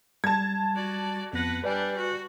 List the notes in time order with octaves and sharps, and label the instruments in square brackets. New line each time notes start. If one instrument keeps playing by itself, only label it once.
[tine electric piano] G3 [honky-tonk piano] A5 G#6
[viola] F#4 D5
[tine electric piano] F2 B3 A#6 [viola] B4 F#5
[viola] G3 D4 [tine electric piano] B4 D5 G#5
[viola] F#4